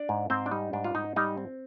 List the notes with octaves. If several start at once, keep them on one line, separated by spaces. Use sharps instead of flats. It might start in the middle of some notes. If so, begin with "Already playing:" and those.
Already playing: D4 D5
G#2
G#2 C4 C5
D4
G3 D#4
G#2 D4
F4
G#2 D#4
G3 D#4
C4